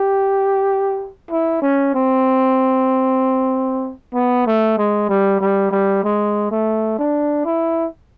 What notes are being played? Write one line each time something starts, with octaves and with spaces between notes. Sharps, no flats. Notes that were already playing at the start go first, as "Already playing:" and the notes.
Already playing: G4
E4
C#4
C4
B3
A3
G#3
G3
G3
G3
G#3
A3
D4
E4